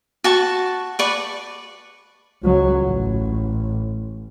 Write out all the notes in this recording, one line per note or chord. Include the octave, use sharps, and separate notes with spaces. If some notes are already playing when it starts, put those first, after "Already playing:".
F#4 A5 C#6
B4 D5 C#6
C#2 F#3
A1